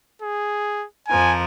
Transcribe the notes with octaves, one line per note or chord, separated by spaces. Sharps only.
G#4
F2 F3 A#4 G#5